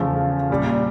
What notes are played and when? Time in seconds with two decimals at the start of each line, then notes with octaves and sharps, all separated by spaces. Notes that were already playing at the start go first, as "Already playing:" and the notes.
Already playing: E2 C#3 F3 A3
0.50 A#2 G3